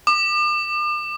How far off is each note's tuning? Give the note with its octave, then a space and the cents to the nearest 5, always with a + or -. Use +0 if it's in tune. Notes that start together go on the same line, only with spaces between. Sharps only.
D6 +40